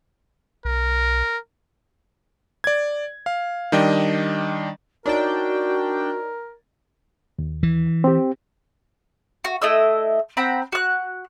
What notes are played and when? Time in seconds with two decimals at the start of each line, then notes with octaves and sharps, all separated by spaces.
0.65 B1 A#4
2.64 D5 G#6
3.26 F5
3.72 D#3 G3 D4 D#5 G5
5.06 D4 D#4 F#4 A#4 C#5 D5 G5
7.39 D#2
7.63 E3
8.04 C4 G4
9.44 F#4
9.62 A3 E4 D#5 E6
10.37 C4 F#5 A#5 B5
10.72 F#4 F#6